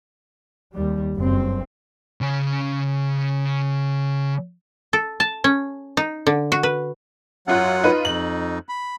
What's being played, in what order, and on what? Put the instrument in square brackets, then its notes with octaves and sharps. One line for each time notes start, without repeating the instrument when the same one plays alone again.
[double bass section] D#2 G3
F#1 G2 C4
[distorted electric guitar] C#3 C#4
[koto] A4
A5
C#4
D#4
D3
F#4
B4
[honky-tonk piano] F#2 F4 F#6 [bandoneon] F#3 F#5
[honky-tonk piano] D#4 F4 B4
[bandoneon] F2 D#4 [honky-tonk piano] F#7
[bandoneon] B5